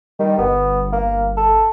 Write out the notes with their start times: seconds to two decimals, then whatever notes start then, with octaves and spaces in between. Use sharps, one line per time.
0.19 D#3 G3
0.39 G1 B3
0.92 A#3
1.37 A4